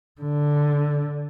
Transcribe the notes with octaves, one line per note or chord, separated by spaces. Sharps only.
D3